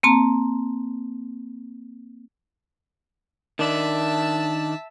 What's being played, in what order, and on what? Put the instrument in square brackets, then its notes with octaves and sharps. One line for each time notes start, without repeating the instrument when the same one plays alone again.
[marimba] A#3 C4 A5 A#5
[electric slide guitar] D#3 D4 [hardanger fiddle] E5 A5